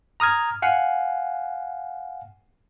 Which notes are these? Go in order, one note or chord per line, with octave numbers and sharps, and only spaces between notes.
A#5 D#6 F6 G#6
F5 F#5 G#5